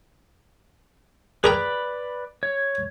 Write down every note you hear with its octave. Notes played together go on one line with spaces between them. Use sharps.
G#4 A#4 B4 D5 G5 B5
C#5